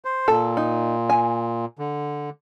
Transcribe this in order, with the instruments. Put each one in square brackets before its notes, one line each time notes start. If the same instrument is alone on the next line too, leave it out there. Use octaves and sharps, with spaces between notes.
[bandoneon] C5
[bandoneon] A#2 [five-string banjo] A4
[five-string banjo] D#4
G#5
[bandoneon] D3